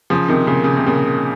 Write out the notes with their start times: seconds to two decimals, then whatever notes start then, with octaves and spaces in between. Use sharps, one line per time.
0.10 C#3 F3
0.28 C3 D#3
0.47 A#2 C#3
0.64 C#3
0.76 C3
0.86 A#2 C#3